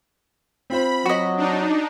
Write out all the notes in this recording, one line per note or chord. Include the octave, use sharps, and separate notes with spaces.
C4 F4 C5 B5
F#3 F#4 D#5
D4 D#4